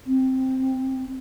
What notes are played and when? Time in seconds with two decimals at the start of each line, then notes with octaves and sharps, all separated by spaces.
0.07 C4